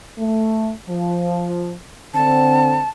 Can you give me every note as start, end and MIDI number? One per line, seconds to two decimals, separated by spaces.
0.18 0.71 57
0.88 1.75 53
2.14 2.80 50
2.14 2.80 60
2.14 2.89 81